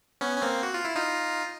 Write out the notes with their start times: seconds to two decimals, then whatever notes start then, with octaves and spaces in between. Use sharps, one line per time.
0.21 B3 C#4
0.37 C#4
0.42 A#3 C4
0.63 F#4
0.74 F4
0.85 E4
0.95 D#4 F4